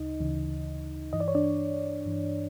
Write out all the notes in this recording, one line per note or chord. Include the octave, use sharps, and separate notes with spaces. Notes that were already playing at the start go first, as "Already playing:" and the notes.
Already playing: D2 C#3 D#4 D#5
D2 C#3 E3
G2 E3 D#5
D5
C#5
D4 D5
G2 E3